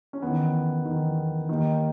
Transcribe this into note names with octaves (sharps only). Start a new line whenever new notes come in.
C#4
E2 D#3 B3
E2 D#3
D#2 D#3 D#4